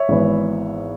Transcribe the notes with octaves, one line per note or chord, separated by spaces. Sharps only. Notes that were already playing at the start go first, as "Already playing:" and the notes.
Already playing: C#5 E5
G#1 G#2 E3 B3